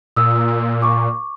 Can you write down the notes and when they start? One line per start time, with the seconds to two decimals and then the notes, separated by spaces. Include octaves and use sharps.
0.16 A#2 D#6 E6
0.82 C#6 D6